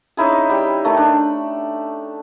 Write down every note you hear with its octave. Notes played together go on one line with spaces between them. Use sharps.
C#4 D#4 E4 G#4
G3 G5
D#3 A3
D4